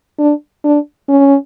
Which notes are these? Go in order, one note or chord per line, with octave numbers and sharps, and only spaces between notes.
D4
D4
C#4